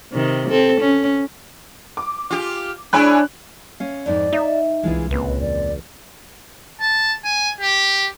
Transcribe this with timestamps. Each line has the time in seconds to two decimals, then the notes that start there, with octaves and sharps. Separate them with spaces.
0.12 C3 D#3
0.50 C4 A4
0.80 C#4
1.97 D6
2.31 F4 G4
2.93 G#3 D4 E4 C#5 G#5 B5 F#6
3.80 C#4 F5
4.06 F2 G#2 D#4 D5
4.33 D#4 E5
4.83 C2 E3 G#3 D4 F4 G#4
5.11 C#2 A#2 C4 B4
5.41 E2 D5
6.81 A5
7.24 G#5
7.60 G4